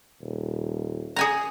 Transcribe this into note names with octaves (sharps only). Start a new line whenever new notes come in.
D#1
G#4 G#5 A#5